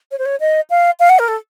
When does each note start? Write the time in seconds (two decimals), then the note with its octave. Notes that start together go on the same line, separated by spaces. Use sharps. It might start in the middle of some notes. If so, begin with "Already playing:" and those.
0.11 C#5
0.18 C5
0.25 C#5
0.40 D#5
0.70 F5
1.00 F5
1.09 F#5
1.19 A#4
1.28 A4